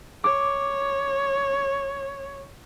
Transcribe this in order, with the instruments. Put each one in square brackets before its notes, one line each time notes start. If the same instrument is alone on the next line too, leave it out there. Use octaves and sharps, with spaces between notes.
[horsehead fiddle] C#5 [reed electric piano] D6